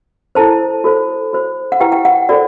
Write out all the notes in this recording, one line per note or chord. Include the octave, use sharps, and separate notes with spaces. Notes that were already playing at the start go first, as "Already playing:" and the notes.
E4 A4 C5 A5
F#4 A4 C5
F#4 C5
F#5
E4 G4 B4 G5
G5
F#5
F#4 A4 C5 D5